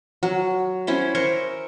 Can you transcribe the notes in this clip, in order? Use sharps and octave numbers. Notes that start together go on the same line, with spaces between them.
F#3
C#4 E4 C5
A#4 C5 C#6